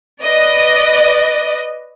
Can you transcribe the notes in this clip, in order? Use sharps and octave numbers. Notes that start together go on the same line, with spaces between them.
B4 D5 D#5